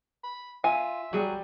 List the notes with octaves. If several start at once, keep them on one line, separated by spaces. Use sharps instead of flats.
B5
F4 E5 G#5
F#3 G3 G#4